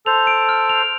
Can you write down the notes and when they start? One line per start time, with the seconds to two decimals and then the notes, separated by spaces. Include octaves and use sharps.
0.06 A4 C5 F7
0.27 D7
0.49 F6
0.69 F7